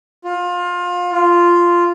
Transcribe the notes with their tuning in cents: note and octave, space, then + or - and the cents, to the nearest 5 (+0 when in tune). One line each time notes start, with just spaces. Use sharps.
F4 +25
F4 -5